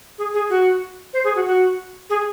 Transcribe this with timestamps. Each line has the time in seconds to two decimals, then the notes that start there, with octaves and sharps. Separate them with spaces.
0.18 G#4
0.34 G#4
0.50 F#4
1.13 C5
1.24 G#4
1.35 F#4
1.46 F#4
2.10 G#4